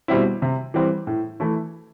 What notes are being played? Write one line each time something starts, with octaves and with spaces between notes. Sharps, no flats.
B2 G3 C4 E4
C3
E3 G3 C4
A2
E3 A3 E4